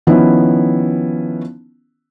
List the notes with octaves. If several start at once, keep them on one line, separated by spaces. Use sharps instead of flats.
D#3 F3 B3 C#4 E4